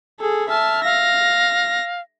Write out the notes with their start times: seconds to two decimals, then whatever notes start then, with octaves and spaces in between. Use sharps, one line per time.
0.20 G#4 A4
0.50 E5 A5 F6
0.84 F5 A#6